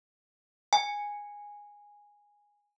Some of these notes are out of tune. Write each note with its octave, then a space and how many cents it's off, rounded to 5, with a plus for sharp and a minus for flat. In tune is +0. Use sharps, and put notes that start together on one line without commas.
G#5 -10